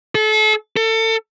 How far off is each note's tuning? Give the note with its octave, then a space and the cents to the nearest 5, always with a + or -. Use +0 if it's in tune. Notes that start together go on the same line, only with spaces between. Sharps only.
A4 -35
A4 +30